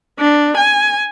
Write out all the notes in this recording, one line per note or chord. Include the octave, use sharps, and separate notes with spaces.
D4
G#5